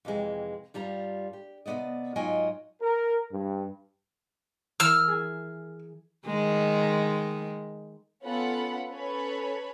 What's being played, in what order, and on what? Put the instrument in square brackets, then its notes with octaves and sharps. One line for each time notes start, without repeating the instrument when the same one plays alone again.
[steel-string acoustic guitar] F2 C3 E3 G#3
G2 G3 F4 A#5
G4
C3 F3 B3 D5 D#5
G#2 F#3 F4 D#5 G5 G#5
[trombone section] A#4
G2
[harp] E3 A#4 [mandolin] E6 F6
[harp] G#4 G#5
[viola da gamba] D#3 G#3
[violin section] B3 C#4 F4 A4 F#5 B5
C#4 A4 B4 C#5 B5